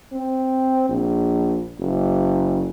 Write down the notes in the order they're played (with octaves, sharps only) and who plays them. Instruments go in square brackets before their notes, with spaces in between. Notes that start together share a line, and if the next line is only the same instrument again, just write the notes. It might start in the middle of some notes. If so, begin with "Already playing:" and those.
[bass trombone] C4
A#1
F#1